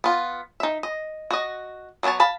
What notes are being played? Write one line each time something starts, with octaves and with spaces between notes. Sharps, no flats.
B3 F4
D#4 E5
D#5
F#4 D#5
F#3 G#3 B3 C#5 A5
F5 A5 B5